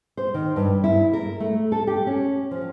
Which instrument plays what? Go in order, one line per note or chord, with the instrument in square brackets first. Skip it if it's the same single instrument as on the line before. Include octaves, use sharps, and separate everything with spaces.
[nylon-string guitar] C5
D#3
G2
E4
A#4
A3
A4
G4
C#4
F3